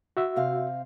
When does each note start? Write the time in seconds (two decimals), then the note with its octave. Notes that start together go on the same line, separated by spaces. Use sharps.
0.17 F#4 E5
0.36 C3 C4 F5